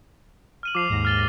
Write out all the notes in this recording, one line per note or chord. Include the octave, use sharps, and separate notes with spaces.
F6 D#7 F#7
F3 D6 C7 F7
D#2 G#2 A#6
F6 A6 G7